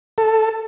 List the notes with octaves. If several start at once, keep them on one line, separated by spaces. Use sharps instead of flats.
A4